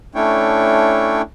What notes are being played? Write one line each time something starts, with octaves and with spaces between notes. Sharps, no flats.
A3 C#4 D4 E4 C#5 G5